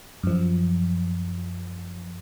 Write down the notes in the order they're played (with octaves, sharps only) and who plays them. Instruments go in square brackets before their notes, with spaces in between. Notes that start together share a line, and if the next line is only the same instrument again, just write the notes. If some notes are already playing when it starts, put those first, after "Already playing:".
[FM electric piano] F#2 F3